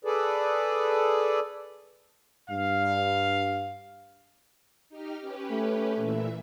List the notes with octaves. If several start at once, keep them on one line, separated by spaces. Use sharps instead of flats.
G#4 A4 B4 D5
G2 F5
D#4 G4 F6
C#4 G4 B4
A3
A#2 E3 E5